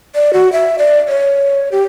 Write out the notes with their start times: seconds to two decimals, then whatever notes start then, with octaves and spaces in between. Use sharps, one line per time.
0.15 D5
0.33 F#4
0.53 E5
0.79 D5
1.08 C#5
1.72 G4